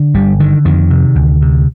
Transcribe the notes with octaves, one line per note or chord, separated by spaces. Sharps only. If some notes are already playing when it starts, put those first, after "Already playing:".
Already playing: D3
G1 G3
D3 D#3
F2 D#3
C3
D2
C3